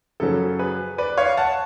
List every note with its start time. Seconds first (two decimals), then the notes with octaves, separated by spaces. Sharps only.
0.20 F#2 C#3 F#3 C#4 A4
0.59 G#4 B4
0.98 B4 D5
1.18 C#5 F5
1.37 F#5 A5